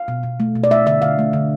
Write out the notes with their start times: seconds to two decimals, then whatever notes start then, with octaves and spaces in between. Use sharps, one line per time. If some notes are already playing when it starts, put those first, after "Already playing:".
Already playing: F5
0.08 B2
0.23 B2
0.40 A3
0.56 B2
0.64 D5
0.70 A3 E5
0.86 D3 E5
1.02 D3 F5
1.19 A3
1.33 D3